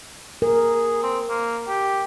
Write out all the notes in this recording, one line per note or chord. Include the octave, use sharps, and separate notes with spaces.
G#4 A#4
C4
A#3
G4